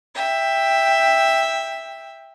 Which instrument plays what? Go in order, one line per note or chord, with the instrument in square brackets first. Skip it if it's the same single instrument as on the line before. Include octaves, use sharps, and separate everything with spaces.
[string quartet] E5 G5